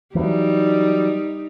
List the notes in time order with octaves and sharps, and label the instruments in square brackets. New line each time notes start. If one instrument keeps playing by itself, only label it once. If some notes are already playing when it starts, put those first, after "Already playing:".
[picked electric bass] E3 F#3 [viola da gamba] G3 D#4